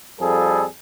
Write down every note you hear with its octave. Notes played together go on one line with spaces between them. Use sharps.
F2 F3 G3 G#4 A4